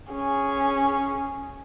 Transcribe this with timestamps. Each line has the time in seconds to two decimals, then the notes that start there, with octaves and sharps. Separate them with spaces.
0.12 C#4 G#4